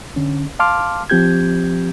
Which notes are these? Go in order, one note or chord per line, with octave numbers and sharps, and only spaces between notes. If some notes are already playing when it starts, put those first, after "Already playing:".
D3 C#4
F5 A5 C6 D6 F6
F3 C4 G4 G6 G#6